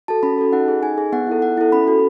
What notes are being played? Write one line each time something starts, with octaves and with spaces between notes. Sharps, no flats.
F#4 A4 A5
C#4 B5
F#4 A4
D#4 F#5
G#4
D#4 G#5
G#4
B3 F#5
E4 A4
B3 F#5
E4 A4
C#4 B5
F#4 A4